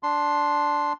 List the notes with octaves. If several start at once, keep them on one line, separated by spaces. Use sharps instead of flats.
D4 C6